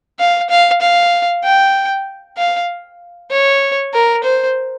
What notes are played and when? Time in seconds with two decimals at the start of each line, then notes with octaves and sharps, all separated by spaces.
0.19 F5
0.50 F5
0.81 F5
1.44 G5
2.37 F5
3.31 C#5
3.94 A#4
4.24 C5